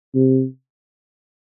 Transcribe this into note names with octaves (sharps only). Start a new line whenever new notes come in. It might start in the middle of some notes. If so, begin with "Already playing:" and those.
C3